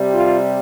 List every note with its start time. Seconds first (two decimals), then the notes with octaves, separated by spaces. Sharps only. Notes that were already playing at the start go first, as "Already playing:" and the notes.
Already playing: C3 G3
0.14 F4